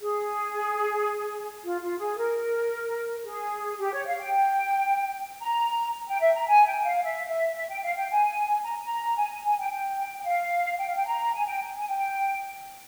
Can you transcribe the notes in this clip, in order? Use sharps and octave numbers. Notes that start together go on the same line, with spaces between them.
G#4
F4
F4
G#4
A#4
G#4
G4
C#5
F5
G5
A#5
G5
E5
A#5
G#5
G5
F5
E5
E5
E5
G5
F5
G5
G#5
A#5
A#5
G#5
G#5
G#5
G5
G5
G5
F5
G5
F5
G5
A#5
G#5
G5
G#5
G5